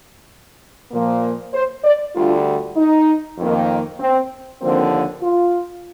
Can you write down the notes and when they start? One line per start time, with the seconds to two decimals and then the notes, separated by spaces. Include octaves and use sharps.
0.92 A#2 F3 A#3
1.53 C5
1.84 D5
2.15 D2 D3 G3 F4
2.76 D#4
3.38 F2 D#3 A#3
4.00 C4
4.61 D#2 D3 F3 A#3 C4
5.22 F4